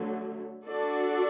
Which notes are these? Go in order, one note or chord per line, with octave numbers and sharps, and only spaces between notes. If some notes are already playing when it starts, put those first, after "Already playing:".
Already playing: D3 F#3 A3
D4 F#4 A4 D5